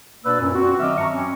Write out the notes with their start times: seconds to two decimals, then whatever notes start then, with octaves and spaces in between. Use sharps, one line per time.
0.24 B2 A#3 D4 B4 D5 E6
0.40 F#2 A#2 C#4
0.53 C4 F#4
0.79 D#3 F#3 D#5 E5 D6 F6
0.97 G2 D4 A#5 C#6
1.12 C4 C#4